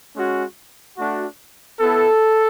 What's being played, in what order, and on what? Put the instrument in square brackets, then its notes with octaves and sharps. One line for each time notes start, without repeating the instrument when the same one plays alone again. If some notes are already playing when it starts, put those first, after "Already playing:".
[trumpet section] G#3 C#4 F#4
A3 D4 F#4
B3 E4 A4